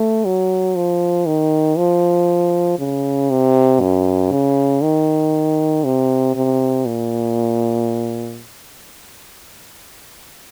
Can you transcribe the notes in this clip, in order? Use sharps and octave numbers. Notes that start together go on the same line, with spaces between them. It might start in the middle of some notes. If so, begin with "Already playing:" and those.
Already playing: A3
F#3
F3
D#3
F3
C#3
C3
F#2
C#3
D#3
C3
C3
A#2